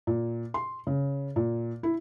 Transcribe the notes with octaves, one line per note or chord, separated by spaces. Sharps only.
A#2
C6
C#3
A#2
E4